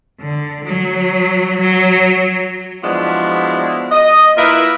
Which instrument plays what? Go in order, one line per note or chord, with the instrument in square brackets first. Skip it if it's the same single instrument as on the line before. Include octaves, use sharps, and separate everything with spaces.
[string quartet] D3
F#3
F#3
[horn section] F3 G#3 B3 D4 E4 F#4
D#5
A#3 E4 F4 A#4 B4 E5